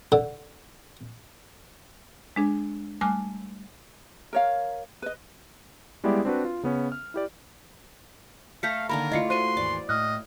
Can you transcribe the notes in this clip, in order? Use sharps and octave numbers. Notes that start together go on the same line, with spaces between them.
D3
G#3 D4 G#4
G3 A3 G#5 D6 F6 F#6
A#4 C#5 F5
B4 D#5
G3 G#3 B3 E4 G4 D5
C4 D4 F#4 B4
F4
C#3 B3 C#4
F6
E4 G4 D5
A3 A4 F5 A#5 G6 B6 C#7
D3 D#3 A#3 A#4 B5
A3 E4 F4 D5 D#5 C7 C#7
F#4 C5 C6 C#6 D#7
D#2 G#2 E3 D5
A2 D#5 D#6 F6 F#6